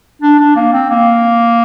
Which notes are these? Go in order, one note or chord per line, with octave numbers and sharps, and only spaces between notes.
D4
D4
A#3
C4
A#3